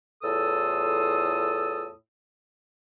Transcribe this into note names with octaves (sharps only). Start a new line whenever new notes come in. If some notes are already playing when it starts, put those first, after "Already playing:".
E2 A2 F4 A4 D#6 E6